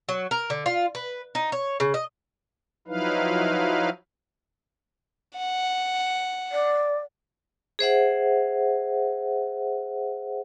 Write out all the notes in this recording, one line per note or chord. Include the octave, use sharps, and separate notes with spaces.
F#3
A#4
D3
F4
B4
D#4
C#5
C#3
D#5
F3 F#3 D#4 E4 B4 F5
F#5
D5
G#4 C5 E5 F#5